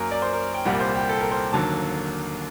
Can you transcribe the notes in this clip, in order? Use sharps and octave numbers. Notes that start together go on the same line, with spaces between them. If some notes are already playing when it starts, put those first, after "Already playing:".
Already playing: F#2 F#3 A#3 A#4
D5
C5
A#4
G5
C2 A#2 G3 F#5
C5
G4
A4
A#4
C5
D#2 D3 F#3 A#3 A5